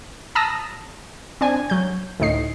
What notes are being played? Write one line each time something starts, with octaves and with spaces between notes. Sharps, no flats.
A5 A#5 D#6 E6 A#6
C4 D4 G#5
F#3 G6
D2 A2 D#4 C7